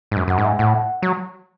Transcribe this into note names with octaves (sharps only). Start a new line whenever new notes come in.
G#2
F#2
F#2 F#5
G#2
E5
A2 F#5
F#3